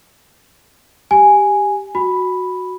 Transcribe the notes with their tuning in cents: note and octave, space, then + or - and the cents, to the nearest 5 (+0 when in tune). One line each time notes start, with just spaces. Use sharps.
G4 +0 G#5 +0
F#4 -10 B5 +0